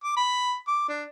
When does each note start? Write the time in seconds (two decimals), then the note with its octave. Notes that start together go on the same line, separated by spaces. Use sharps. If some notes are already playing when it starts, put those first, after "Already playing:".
0.03 D6
0.16 B5
0.68 D6
0.89 D4